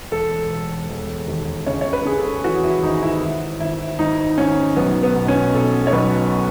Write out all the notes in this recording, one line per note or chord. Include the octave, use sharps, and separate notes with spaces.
E1 A4
E1
E1
D#2
C#3 C#5
C#5
B4
C#3 G#4
A4
E3 F#4
E4
G#1 D#4
E4
G#1
G#1 E4
G#1 D#4
G#1 C#4
B1 B3
B3
B2
C#4
B2 A4
C#5
B1 B4